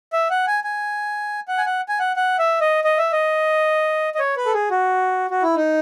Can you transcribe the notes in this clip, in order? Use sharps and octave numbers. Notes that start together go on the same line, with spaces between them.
E5
F#5
G#5
G#5
F#5
G#5
F#5
G#5
F#5
F#5
E5
D#5
D#5
E5
D#5
D#5
C#5
B4
A4
G#4
F#4
F#4
E4
D#4